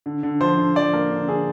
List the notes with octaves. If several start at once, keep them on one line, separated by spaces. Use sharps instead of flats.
D3
D3
F3 C5
D3
F3 D5
A#3 A#4
D3
D3 G#4